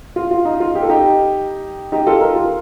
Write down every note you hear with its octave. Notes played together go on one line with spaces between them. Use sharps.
F4
F4
D#4
F4
G4
A4
D#4 G4
D#4 G4
F4 A4
G4 A#4
F4